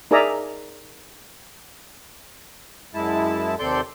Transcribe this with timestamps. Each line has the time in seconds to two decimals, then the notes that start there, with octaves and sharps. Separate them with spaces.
0.11 D#4 G#4 A#4 D5 E5 A#5
2.94 F#2 G#3 E4 A5
3.59 D#2 C3 A4 D5 C6 G6